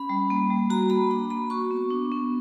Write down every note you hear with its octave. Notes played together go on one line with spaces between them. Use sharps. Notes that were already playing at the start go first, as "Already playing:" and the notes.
Already playing: C#4 B5
G3
A#3
G3
F#4 A#5
A#3 B5
D4 A#5
A#3 B5
F#4 C#6
B3
D4
B3